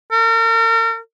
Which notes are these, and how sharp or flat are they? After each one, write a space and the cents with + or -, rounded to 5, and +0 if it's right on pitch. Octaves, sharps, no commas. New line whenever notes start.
A#4 -40